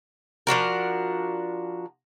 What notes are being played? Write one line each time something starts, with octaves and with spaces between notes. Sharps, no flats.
F3 D4 F#4 A#4